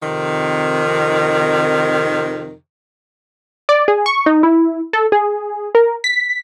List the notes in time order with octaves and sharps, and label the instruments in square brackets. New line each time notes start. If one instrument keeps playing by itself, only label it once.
[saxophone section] F2 C3 D#3
[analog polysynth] D5
G#4
C#6
D#4
E4
A4
G#4
A#4
B6